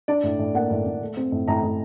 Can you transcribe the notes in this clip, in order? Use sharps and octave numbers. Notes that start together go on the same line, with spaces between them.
D4 D5
A2
A2
A#3 F#5
A2
A2
A3
C4
A2
A2 A#5
A2